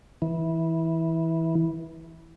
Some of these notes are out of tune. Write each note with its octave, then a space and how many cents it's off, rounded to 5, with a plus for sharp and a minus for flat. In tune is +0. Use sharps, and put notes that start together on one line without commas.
E3 -15